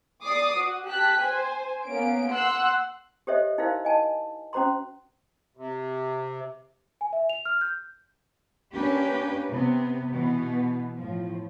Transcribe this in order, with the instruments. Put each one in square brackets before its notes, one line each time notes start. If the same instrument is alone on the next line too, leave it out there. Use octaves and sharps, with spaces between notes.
[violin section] D5 D6 D#6 C7
F#4
G4 G5 A5 F#6 B6
C5 G#5
A#3 B3 C#4 D7
F#5 C6 E6 F#6
[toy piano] G4 A4 C5 C#5 D#5 E5
D#4 E4 F#4 A#4 C5 F5
D#5 G#5 A5
C#4 F#4 C5 A#5 C6
[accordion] C3
[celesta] G#5
E5
F7
F6
G6
[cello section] A#3 C#4 D4 G4 B4
C3 B3
B2 E3 B3
A2 F3